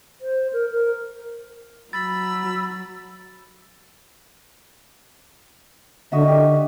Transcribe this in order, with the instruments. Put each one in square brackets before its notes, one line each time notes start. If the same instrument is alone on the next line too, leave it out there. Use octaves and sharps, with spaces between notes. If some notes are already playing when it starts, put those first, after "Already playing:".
[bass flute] C5
A#4
A#4
[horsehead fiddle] F#3 [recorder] B5 [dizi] E6 [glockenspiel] A6
[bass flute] D3 [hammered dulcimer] F#4 D#5 E5
[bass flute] D3 [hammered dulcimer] G4